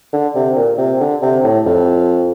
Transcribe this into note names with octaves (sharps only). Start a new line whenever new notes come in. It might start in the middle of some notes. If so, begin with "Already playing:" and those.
D3
C3
A#2
C3
D3
C3
A2
F2